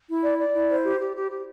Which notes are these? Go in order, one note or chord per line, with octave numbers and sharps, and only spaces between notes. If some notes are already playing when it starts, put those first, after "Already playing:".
E4
D5
D5
E4
C5
G4
G4
G4
G4